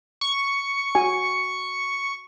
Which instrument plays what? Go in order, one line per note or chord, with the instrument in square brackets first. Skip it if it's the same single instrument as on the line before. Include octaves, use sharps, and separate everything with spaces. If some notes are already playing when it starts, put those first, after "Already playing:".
[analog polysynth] C#6
[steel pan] F#4 G#5